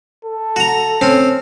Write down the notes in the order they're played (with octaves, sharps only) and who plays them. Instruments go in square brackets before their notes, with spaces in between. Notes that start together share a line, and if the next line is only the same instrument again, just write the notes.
[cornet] A4
[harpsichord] F#4 A#5
C4 C#4